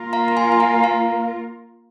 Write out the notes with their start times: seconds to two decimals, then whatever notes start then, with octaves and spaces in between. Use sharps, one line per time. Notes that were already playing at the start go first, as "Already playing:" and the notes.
Already playing: A#3 F4 A#4
0.13 F5 A#5
0.28 A#5
0.37 G#5 C6
0.52 G#5
0.60 F5 A#5
0.84 F5 A#5